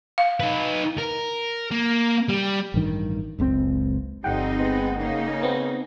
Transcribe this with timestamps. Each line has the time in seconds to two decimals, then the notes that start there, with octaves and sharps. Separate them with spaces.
0.18 F5
0.40 D#4 B4
0.98 A#4
1.71 A#3
2.28 G3
2.74 A1 G2 D#3
3.39 F#1 C#2 B2 C4
4.24 G1 F2 G3 C4 D#4 F#5 G5
4.59 G#3 B3
4.97 C#3 A#3 D#4
5.43 B3 C4